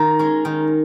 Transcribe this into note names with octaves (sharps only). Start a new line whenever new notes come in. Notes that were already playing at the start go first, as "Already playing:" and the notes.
Already playing: D#3 F4 A#5
G#3 C#4
D#3